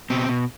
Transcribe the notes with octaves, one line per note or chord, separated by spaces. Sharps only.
B2 C4
B2